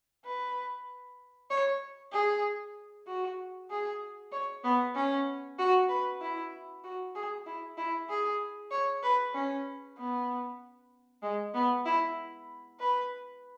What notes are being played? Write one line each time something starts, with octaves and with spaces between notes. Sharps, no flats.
B4
C#5
G#4
F#4
G#4
C#5
B3
C#4
F#4
B4
E4
F#4
G#4
E4
E4
G#4
C#5
B4
C#4
B3
G#3
B3
E4
B4